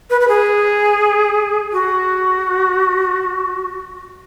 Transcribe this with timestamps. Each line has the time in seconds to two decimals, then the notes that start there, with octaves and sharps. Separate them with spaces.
0.10 B4
0.21 B4
0.28 G#4
1.73 F#4